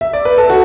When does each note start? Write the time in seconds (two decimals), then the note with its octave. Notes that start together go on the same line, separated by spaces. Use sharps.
0.01 E5
0.13 D5
0.25 B4
0.38 A4
0.50 F#4